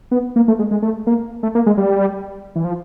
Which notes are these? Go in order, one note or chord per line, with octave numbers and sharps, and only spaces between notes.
B3
A#3
A3
G#3
G#3
A3
A#3
A3
A#3
G#3
G3
E3
F3